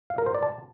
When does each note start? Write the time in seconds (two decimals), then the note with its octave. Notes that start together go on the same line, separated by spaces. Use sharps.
0.10 F5
0.18 A#4
0.26 C5
0.34 D5
0.43 A5